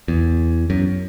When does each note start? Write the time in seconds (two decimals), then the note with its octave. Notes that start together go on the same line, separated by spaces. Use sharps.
0.08 E2
0.70 F#2